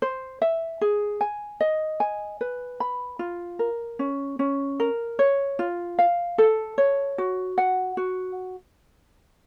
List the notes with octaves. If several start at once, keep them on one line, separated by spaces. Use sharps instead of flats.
C5
E5
G#4
G#5
D#5
G#5
B4
B5
F4
A#4
C#4
C#4
A#4
C#5
F4
F5
A4
C#5
F#4
F#5
F#4